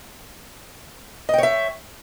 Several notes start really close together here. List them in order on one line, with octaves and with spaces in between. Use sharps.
D#5 G5 C#5 E5